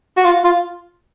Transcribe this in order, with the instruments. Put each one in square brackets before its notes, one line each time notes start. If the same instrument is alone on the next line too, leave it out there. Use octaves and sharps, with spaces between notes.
[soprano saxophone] F#4
F4
F4